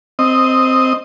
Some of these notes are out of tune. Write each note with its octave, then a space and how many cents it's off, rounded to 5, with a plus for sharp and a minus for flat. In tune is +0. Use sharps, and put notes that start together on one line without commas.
C4 +0 D#5 +0